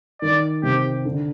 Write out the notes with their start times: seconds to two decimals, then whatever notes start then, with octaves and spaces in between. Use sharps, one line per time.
0.22 D#3 D5
0.63 C3 G4
1.05 D3